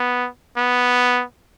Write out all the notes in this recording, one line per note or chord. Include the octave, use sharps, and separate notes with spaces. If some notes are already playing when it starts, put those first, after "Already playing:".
Already playing: B3
B3